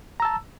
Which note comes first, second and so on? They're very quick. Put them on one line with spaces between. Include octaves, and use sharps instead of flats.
A#5 E6 A5